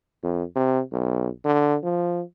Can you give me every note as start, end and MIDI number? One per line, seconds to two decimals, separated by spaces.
0.23 0.43 41
0.56 0.81 48
0.92 1.29 35
1.45 1.77 50
1.83 2.22 53